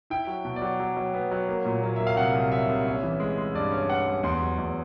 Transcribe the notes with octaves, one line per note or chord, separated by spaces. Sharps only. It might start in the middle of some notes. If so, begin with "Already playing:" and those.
E4 G5
F#3
B2
D5
F#3
F#3
F#3
B3
F#3
A#3
A#2
F#3
A#3 E5
F5
C2 F#5
C2
F#3 E5
C2
C#4
E3
G#3
G#3
G2 D5
C#4
C#4 F#5
G#3
E2 C6
F#3
E2